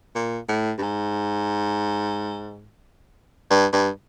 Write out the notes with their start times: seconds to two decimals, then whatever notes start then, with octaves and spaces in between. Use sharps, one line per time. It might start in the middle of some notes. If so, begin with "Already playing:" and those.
0.16 A#2
0.49 A2
0.78 G2
0.83 G#2
3.51 G2
3.73 G2